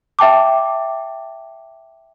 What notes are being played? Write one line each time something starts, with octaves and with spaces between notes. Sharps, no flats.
E5 G5 A5 D6